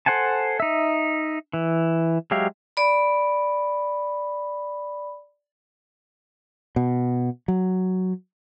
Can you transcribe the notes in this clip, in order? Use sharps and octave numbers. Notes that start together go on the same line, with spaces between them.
A4 C5 F#5 G#5 A5
D#4 E5
E3
F#3 G#3 G4 E5 F5
D5 B5
B2
F#3